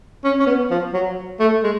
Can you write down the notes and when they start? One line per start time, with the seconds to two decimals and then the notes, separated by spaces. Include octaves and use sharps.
0.24 C#4
0.40 C#4
0.47 B3
0.70 F3
0.93 F#3
1.40 A3
1.63 G#3